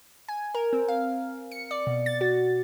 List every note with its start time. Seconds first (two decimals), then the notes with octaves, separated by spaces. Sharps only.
0.28 G#5
0.54 A#4
0.73 C4
0.88 F5
1.52 C#7
1.71 D5
1.87 B2
2.06 A6
2.21 F#4